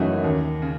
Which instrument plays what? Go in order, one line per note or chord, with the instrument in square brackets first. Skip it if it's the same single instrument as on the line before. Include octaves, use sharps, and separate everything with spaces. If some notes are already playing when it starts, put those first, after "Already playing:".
Already playing: [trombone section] F#2 [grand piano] C#3 E3 A3 D#4 F#4
[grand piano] D#2
C#3